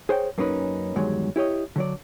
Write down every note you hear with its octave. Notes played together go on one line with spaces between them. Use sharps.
G#4 C5 C#5 G5
F#2 A#3 C#4 D#4 B4
E2 G2 D#3 F#3 G#3
E4 G4 C#5 D#5
D3 F#3 D5